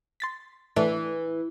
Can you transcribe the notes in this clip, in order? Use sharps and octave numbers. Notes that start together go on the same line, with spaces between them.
C6 A6 B6
E3 A3 D4 E4